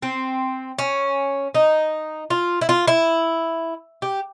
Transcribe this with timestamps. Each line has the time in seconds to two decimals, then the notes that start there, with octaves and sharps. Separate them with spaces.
0.02 C4
0.79 C#4
1.54 D#4
2.30 F4
2.61 E4
2.69 F4
2.88 E4
4.02 G4